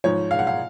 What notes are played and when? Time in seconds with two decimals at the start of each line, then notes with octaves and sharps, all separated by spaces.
0.04 G#2 F3 C#5
0.31 F5
0.39 F#5
0.47 F5